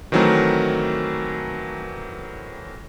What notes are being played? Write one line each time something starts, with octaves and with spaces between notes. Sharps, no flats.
D#3 E3 F#3 A3 C4 A#4